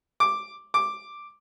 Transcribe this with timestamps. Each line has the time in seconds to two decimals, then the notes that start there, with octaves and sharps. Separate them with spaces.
0.20 D6
0.74 D6